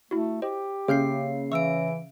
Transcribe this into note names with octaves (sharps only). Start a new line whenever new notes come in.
A3 E4 F#4
G4 C5 D#5
C#3 A#3 G#4 F6 G6 C7
E3 E5 C#6 E6 D7